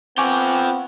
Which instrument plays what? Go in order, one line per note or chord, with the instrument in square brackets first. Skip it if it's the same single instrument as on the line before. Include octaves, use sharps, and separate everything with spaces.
[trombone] B3 [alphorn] C4 [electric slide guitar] F4 A4 G5 [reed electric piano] G#5 C#6 D6